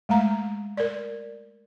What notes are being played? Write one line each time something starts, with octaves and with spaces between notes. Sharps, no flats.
G#3 A3 A#5
A#4 D5